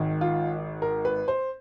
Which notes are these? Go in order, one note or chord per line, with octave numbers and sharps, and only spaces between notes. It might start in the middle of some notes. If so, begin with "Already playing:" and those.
Already playing: G#1 G#2 D#3
F4
A#4
B4
C5